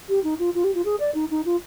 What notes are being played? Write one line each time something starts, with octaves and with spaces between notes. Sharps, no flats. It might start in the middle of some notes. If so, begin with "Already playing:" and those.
G4
D#4
F4
F4
G4
F4
G#4
D5
D#4
D#4
F4